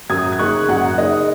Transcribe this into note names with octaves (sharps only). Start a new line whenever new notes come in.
F#2 D#6 G#6
G#6
C#3 A#3 D#4 C#6 F#6
F#2 F#5
C#3 A#3 D#4 D#5